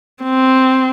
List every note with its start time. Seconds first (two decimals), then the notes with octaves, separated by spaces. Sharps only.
0.23 C4